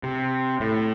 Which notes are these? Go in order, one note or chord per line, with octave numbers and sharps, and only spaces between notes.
C3
A2